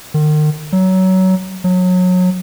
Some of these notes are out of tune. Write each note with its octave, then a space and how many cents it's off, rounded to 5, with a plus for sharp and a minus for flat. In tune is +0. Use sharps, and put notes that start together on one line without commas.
D#3 -40
F#3 +20
F#3 -25